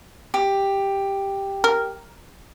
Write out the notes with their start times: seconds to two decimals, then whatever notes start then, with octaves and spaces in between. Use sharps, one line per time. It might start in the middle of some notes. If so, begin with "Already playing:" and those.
0.34 G4
1.64 A#4